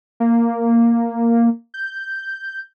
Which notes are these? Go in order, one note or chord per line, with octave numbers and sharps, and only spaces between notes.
A#3
G6